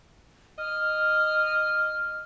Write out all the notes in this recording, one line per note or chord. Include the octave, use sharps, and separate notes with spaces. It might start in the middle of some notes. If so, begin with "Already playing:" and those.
D#5 F6